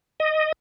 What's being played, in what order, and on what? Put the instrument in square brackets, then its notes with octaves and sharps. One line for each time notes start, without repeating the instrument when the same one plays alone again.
[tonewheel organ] D#5